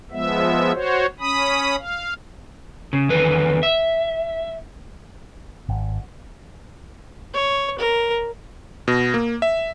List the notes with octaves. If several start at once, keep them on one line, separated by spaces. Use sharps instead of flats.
F3 G#3 B3 E5
F#4 C5 C#5
C#4 B5 D#6
F5
C#3
E2 D3 D#3 B4
E5
G#1
C#5
A#4
B2
A#3
E5